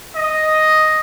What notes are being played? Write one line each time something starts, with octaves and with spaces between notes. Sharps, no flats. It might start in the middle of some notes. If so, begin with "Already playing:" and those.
D#5